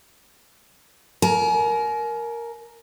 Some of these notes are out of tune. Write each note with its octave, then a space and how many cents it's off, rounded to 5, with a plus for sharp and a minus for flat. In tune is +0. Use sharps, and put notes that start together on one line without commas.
A#4 +0 G#5 +40